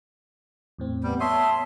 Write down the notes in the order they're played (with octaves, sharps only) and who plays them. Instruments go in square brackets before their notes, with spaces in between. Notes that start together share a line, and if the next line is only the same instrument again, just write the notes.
[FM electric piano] E2 A2 C4
[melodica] G3 [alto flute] B3
[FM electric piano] C#5 D#6 [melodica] E5 C6 [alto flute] A5